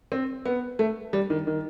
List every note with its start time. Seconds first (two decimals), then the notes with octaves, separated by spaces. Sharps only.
0.12 C4
0.45 B3
0.79 A3
1.13 G3
1.30 D#3
1.47 D#3